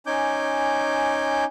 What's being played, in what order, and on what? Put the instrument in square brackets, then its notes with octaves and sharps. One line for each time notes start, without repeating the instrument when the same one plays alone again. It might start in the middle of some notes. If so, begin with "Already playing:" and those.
[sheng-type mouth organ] C#4 D#4 G#5 D6 G6